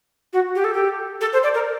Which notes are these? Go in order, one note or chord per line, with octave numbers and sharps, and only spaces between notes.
F#4
G4
A4
G4
A4
C5
D5
A#4